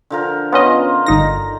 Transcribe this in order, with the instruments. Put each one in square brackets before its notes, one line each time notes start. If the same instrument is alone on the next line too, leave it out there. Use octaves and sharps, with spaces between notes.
[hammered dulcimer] D3 F3 A#4
[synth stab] B3 C#4 D#5 [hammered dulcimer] F4
[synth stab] G1 D#4 A#6